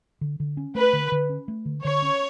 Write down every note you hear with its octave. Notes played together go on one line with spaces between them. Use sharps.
D3
D3
C#4
A3 B4
D3
D3
C#4
A3
D3
D3 C#5
C#4